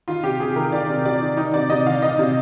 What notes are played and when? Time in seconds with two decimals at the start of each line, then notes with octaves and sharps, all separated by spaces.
0.08 D#3 F4
0.23 C3 G4
0.40 C3 G#4
0.56 D#3 A#4
0.72 D#3 D5
0.89 C3
1.05 C3 D5
1.21 D#3
1.37 D#3 D#4
1.54 C3 D5
1.70 C3 D#5
1.86 D#3 F5
2.02 D#3 D#5
2.19 C3